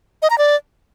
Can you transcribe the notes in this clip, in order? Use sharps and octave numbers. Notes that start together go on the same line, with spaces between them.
D#5
A#5
D5